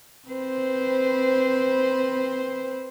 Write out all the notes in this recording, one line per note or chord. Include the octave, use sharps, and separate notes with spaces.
C4 B4 C5